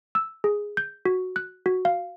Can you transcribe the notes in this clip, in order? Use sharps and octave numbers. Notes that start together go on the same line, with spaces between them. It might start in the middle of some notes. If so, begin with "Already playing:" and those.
E6
G#4
G6
F#4
F#6
F#4
F5